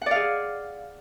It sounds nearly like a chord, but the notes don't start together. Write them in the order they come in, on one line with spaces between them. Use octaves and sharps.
F#5 D5 F5 G#4